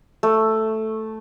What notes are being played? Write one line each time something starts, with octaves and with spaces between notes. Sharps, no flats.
A3